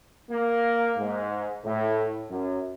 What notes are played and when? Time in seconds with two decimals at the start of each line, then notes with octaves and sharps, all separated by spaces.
0.30 A#3
0.97 G#2
1.64 A2
2.29 F#2